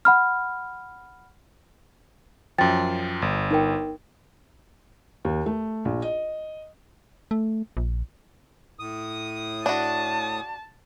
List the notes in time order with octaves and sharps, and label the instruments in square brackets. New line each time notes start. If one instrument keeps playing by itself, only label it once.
[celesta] F#5 B5 F6
[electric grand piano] F#2 F3 [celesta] G5 A6
[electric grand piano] G1
[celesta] D#4 A#4 G5
[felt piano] D#2
A3
A#1
D#5
[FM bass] A3
A#1
[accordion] A2 D#6
[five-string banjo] D4 F#4 [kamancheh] A5